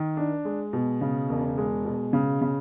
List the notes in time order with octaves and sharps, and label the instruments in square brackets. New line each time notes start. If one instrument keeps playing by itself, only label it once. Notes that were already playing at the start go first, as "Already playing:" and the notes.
Already playing: [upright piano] D#3
D4
G#3
B2
C#3
E1
G#3
B2
C#3
C#3